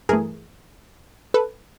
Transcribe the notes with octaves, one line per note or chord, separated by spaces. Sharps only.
G2 E3 A3 G#4 A#4
A4 B4